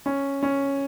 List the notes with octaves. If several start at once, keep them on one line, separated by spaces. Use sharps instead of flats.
C#4
C#4